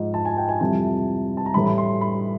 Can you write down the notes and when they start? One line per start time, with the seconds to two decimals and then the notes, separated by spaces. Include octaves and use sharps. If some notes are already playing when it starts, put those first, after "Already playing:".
Already playing: G#2 F3 D#5
0.14 A5
0.25 G#5
0.37 G5
0.49 G#5
0.61 F2 C3 E3 G3 A5
1.37 A5
1.46 A#5
1.54 A2 E3 G3 B5
1.67 B5
1.78 C6
2.01 B5